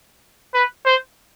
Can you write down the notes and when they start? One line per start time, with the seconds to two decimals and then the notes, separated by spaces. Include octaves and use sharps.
0.54 B4
0.85 C5